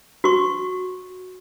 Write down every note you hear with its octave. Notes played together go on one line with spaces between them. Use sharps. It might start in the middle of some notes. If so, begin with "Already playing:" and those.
F#4 C#6